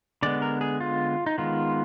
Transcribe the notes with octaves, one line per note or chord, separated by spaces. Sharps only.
D3 G#3 B3 D5
A#4
G#4
F4
D#4
D#3 G#3 B3 F4